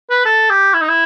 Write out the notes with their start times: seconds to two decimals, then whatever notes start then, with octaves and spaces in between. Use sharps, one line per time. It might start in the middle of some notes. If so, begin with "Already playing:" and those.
0.10 B4
0.25 A4
0.50 G4
0.74 E4
0.82 D#4
0.89 E4